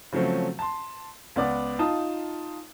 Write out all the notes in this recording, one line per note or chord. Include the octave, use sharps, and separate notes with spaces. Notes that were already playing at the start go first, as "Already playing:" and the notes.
C#3 F3 F#3 A3 C4
A5 C6
C#2 B3 D5 D6
D#4 F4 A5 D#6